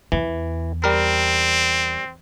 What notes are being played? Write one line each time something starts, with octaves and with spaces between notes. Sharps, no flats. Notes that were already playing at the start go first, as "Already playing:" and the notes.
E2 E3
G3 C4 A#4